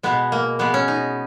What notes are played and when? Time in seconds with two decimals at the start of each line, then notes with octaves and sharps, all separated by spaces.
0.03 B2 G#3 B3
0.32 A#3
0.59 B2 G#3 B3
0.74 C#4
0.88 D#4